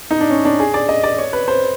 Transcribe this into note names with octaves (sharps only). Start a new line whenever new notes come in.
D#4
D4
C#4
D4
G#4
D5
D#5
D5
C#5
B4
C5